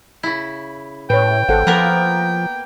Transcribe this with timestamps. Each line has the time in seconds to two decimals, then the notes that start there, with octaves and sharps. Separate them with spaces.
0.23 C#3 E4
1.10 A2 B4 C#5 G5
1.49 G#1 A4 C5 F#5
1.67 F3 A#3 B3 A#4